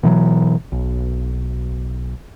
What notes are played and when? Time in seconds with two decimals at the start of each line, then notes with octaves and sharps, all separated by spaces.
0.03 B2 E3 F#3
0.72 B1